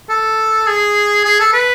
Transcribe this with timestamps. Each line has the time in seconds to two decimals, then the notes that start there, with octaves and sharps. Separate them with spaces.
0.09 A4
0.67 G#4
1.25 G#4
1.40 A4
1.53 B4